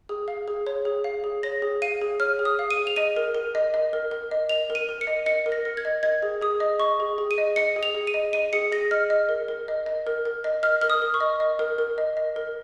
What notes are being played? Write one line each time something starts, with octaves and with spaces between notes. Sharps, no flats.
G#4
F5
G#4
C#5
G#4
F5
G#4
C#5 A#6
G#4
F5 D#7
G#4
C#5 F6
G#4
D#6
F5
D#7
G#4
F7
D#5 D#7
A#4
A#4
D#5
D#5
A#4
A#4
D#5
D#5 F7
A#4
D#7
A#4
C#7
D#5
D#5 C#7
A#4
A#6
A#4
G#6
D#5
D#5 G#6
G#4
G#4 D#6
D#5
D#5 C#6
G#4
G#4
D#7
D#5
D#5 C#7
G#4
F7
G#4
D#7
D#5
D#5 D#7
G#4 C#7
G#4 A#6
D#5 F6
D#5
A#4
A#4
D#5
D#5
A#4
A#4
D#5
D#5 F6
A#4 F6
D#6
A#4
C#6
D#5
D#5
A#4
A#4
D#5
D#5
A#4